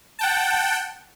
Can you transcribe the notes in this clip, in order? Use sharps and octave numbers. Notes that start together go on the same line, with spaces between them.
F#5 G5 A5